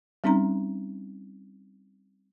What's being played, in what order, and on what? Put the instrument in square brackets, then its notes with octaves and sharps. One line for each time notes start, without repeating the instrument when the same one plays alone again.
[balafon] G3 C4 C#4 D#4 A#5